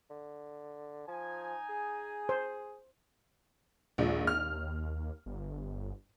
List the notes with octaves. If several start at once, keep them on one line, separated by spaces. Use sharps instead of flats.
D3
F3 D#4 G#5
G#4
C5
A#1 D#2 F3 G#3
F6
G1